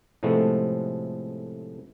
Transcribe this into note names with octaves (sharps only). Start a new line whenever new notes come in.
A2 C3 F3 G#3 A3 B3